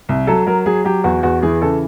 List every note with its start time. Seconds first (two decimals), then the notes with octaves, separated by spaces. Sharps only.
0.09 C2
0.27 F#3 A4
0.47 F#3 A#4
0.66 F#3 G#4
0.85 F#3 G4
1.04 E2 F#4
1.23 E2 F#4
1.42 E3 G#4
1.62 C#3 A4